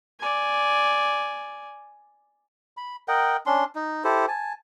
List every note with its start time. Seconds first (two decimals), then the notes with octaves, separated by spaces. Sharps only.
0.20 D5 G#5
2.77 B5
3.08 A#4 D#5 F#5 G5
3.46 C#4 D4 C6
3.75 D#4
4.04 E4 G4 A4 C5
4.28 G#5 A5